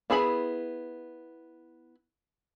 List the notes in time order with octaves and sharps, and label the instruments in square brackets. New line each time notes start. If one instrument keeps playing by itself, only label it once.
[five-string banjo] B3 E4 G#4 B5